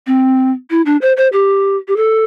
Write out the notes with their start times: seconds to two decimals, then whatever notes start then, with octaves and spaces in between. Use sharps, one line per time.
0.07 C4
0.71 E4
0.86 D4
1.02 C5
1.17 C5
1.32 G4
1.88 G4
1.96 A4